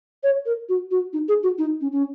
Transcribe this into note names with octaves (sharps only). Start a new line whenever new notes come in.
C#5
A#4
F#4
F#4
D#4
G#4
F#4
D#4
C#4
C#4